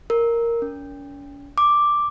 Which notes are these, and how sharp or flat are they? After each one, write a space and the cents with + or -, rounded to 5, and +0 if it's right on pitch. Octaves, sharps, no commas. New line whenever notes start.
A#4 +0
C#4 +40
D6 +0